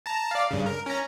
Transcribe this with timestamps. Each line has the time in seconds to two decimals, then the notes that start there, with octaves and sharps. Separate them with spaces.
0.06 A5 A#5
0.31 D5 F5
0.51 G2 C#3
0.66 A#4
0.86 C#4 A#5